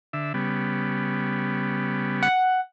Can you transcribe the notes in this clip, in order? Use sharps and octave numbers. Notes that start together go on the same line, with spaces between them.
D3 E5
C#3 G3 B3
F#5